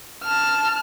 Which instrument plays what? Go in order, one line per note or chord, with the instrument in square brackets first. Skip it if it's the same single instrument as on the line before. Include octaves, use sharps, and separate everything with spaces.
[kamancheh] A5 F6